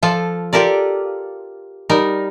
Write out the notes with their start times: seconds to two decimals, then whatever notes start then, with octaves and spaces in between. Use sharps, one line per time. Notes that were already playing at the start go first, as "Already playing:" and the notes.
0.03 F3 F4 A4
0.53 F4 G4 A4 A#4 D5
1.90 G3 D#4 A#4